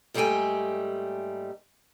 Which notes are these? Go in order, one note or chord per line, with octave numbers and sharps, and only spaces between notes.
G#2 G3 A3 A#3 G5 G#5